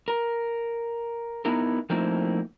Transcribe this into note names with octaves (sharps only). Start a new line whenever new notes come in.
A#4
B3 D#4 E4 A#4
F3 A3 A#3 C4 D#4 E4